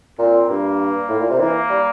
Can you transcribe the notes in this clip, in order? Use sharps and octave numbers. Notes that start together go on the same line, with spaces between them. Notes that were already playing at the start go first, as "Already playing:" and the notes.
A#2 C4
G2 A#3
A2
A#2
C3
E3 A#3
G3